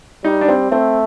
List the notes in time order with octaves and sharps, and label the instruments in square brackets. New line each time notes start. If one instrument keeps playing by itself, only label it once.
[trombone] G3 [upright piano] D#4
[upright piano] D4
C4
[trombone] A3 [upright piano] C4